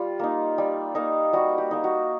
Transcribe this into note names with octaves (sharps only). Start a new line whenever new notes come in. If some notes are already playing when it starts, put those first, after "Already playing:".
Already playing: G3 F4 G4
A#3 D#4
G3
A#3 D#4
G3 F#4
G4
A#3 D#4
F#4